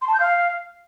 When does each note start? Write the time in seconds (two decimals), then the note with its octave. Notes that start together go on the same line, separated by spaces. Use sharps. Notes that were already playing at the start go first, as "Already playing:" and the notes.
0.01 C6
0.08 A5
0.14 G6
0.20 F5